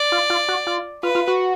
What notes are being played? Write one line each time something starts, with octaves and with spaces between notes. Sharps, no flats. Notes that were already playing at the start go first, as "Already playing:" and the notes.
Already playing: D5
F4
F4
F#4
F4
F4 B4
F4
F#4